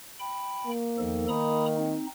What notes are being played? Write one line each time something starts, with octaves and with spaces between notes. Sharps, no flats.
G5 B5
A#3
E2 D#3 F3 A4
D#3 A#5 B5 D#6
C4 D#4